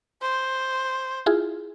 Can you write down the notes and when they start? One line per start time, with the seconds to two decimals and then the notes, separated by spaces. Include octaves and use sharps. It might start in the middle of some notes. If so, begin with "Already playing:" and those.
0.22 C5
1.26 E4 F4 G#4